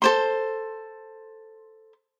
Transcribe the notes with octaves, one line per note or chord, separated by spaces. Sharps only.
A4 C5 C6